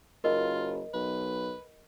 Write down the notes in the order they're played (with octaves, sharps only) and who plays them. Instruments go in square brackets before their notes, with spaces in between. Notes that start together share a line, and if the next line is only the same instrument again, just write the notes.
[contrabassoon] F#1 [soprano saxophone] F4 [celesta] A#4 D#5
[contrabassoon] B1 [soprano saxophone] B4